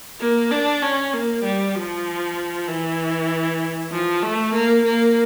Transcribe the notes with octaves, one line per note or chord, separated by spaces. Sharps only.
A#3
D4
C#4
A#3
G3
F3
E3
F3
A3
A#3
A#3